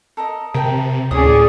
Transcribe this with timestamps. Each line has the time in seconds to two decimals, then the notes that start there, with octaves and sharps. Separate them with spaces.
0.17 A4 A#4 D#5
0.54 C3 A#4 G5 A5
1.11 D2 A2 C#4 G#4 D5 D#6